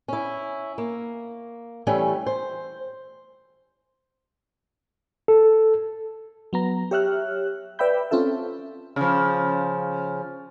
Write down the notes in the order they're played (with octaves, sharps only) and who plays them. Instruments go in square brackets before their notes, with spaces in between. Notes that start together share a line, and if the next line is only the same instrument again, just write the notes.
[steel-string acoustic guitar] C#4 E4
A#3
E3 G3 A3 C#4
C5
[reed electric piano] A4
[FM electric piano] F#3 B3 A#5
G4 C#5 E5 F6 F#6
B4 D5 E5 G5 B5 G6
C4 C#4 F4 A4 E5
[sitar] C#3 F3